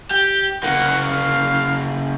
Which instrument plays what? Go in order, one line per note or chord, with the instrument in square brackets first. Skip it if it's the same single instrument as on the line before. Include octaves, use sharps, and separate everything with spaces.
[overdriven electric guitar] G4 [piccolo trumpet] G6
[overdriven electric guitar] C#3 A#3 [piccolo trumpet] F#5
[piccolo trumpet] F5